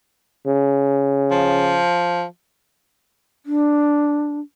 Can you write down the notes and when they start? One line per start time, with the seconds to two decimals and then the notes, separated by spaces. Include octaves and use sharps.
0.47 C#3
1.31 F3
3.46 D4